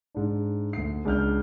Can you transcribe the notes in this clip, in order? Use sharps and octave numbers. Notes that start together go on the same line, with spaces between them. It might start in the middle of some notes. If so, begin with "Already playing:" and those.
G#2 D4
D2 C7
C#2 D4 F6 G6